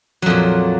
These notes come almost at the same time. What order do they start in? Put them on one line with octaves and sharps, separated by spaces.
F#3 F2 A#2